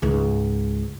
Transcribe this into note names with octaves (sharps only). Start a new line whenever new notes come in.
C#2 G#2